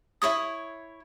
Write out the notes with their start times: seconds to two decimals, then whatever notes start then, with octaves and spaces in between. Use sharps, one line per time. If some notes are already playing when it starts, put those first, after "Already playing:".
0.22 E4 C5 C#5 D#6